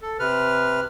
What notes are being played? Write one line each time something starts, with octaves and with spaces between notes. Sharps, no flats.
A4
C3 B4 F6